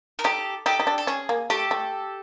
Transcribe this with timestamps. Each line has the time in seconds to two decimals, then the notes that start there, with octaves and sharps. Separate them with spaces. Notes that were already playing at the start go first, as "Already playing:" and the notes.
0.19 A#4
0.24 D#4 G4 A4
0.66 D#4 G4 A4
0.80 D#4
0.87 D4
0.98 A4
1.07 C#4 G#4
1.29 A#3
1.50 A3 G4 A4
1.71 A3